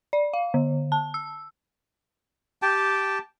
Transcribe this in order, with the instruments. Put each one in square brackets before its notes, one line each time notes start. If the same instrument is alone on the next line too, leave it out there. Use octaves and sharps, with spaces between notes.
[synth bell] D5
F5
D3
A5
E6
[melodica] G4 G5 A5